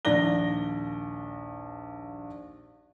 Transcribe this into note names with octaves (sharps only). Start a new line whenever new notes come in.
A#1 D#2 D5 A#6 G7